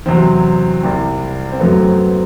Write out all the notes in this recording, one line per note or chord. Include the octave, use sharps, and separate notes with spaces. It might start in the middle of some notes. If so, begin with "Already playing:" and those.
E2 C3 F#3 C4
C2 C3 G3
C4
F#2 F#3 A3 B3
C4
B3